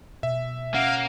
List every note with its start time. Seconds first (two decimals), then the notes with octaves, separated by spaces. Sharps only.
0.23 B2 E5
0.74 A#3 C#4 F5 F#5